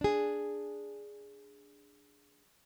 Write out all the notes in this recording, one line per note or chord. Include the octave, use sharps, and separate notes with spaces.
D4 G#4